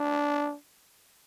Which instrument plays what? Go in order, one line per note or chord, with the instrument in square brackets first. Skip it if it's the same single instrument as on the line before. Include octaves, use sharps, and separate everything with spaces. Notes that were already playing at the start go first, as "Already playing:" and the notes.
Already playing: [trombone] D4